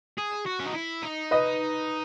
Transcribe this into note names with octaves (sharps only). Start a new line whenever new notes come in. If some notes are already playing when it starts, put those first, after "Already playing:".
G#4
F#4
C#4
D#4
E4
D#4
B4 D#5